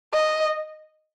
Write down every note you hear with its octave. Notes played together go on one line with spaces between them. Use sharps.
D#5